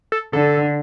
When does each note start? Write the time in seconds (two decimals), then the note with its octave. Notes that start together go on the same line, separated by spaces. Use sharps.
0.12 A4
0.33 D3 A4